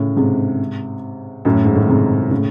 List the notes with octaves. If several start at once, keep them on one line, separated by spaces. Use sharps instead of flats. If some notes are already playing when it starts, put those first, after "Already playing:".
Already playing: A2 C#3
G#2 C3
F#2 A2
G#2
A2
G#2 C3
A2 C#3